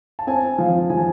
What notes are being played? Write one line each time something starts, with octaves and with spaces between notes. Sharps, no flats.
A5
C4 G#5
F3 F5
F3 G#5
A5